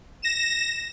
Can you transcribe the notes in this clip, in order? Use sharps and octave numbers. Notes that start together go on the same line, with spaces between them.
A#6 E7